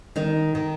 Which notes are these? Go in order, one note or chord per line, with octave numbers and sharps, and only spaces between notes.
D#3 D#4
D#3